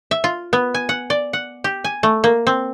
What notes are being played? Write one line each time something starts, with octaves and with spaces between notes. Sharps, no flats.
E5
F4
B3
G#5
F#5
D5
F#5
G4
G#5
A3
A#3
C4